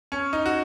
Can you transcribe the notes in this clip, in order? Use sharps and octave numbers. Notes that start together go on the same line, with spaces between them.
C#4
D#4
F#4